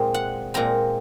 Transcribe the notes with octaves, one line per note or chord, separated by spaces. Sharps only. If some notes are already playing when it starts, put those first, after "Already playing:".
Already playing: A#2 G#3 C4
F#5
A#2 G#3 C4 A#5